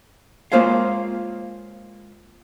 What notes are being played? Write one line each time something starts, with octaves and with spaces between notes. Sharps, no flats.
G#3 A#3 F4 C5 C#5 F5